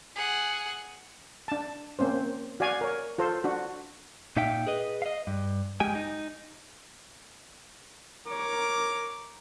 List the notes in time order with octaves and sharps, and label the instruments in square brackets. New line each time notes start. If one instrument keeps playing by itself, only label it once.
[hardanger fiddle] G#4 F#5
[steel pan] D4 A5
A#3 C4 C#4 C5
F#4 D5 F5 G#5
A#4 C#5
F4 A4 C5
D4 F#4
[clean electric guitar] A#2 D#4 E5 F5 G5
G#4 B4 D#5
D#5 F5
G2
G2 G#3 G4 G5 G#5
D#4
[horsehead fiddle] A#4 C#5 [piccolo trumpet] D6